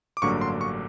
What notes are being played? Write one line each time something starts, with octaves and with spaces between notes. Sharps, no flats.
D6
A1 G2 D3 F#3 A#3 C#6
C6
C#6